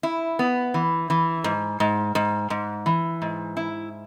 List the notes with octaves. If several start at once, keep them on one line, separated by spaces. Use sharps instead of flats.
E4
B3
E3
E3
G#2
G#2
G#2
G#2
E3
G#2
E4